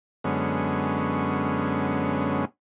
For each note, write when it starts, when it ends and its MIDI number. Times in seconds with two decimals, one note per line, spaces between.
0.24 2.45 42
0.24 2.45 50
0.24 2.45 56
0.24 2.45 59
0.24 2.45 61